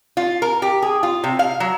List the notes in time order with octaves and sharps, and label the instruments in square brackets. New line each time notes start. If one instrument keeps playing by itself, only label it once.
[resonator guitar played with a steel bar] F4
A#4
G4
G#4
F4
C3
F5
F#3